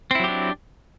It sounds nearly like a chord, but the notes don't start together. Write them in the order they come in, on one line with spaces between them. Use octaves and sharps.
C4 E4 F#3 G4 D4